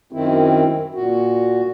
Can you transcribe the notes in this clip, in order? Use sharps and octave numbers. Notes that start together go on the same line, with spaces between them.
F#2 D#3 C4 E4
A#2 F#4